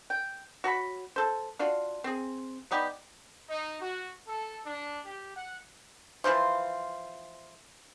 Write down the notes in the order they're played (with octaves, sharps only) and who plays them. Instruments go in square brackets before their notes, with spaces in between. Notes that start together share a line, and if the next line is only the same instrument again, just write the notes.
[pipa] G5
F#4 C#5 A5 B5
A4 C5
D4 F4 F#4
C4 G#4
G3 B3 D#4 G4
[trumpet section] D#4
F#4
A4
D4
G4
F#5
[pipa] E3 F3 F4 C5